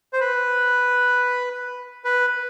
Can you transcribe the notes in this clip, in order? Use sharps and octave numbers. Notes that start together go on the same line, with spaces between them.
C5
B4
B4